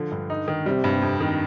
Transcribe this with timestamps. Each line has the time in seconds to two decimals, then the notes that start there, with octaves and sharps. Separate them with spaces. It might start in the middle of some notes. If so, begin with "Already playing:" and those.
Already playing: D3 F3
0.11 G2
0.30 D#4
0.48 D#3
0.66 C3 G3
0.84 G2
1.02 F2
1.21 D#3